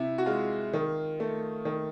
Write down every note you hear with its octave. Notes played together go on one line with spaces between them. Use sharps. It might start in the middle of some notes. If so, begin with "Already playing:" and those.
Already playing: C3 E4
F#4
G#3 F4
D#3
A3
D#3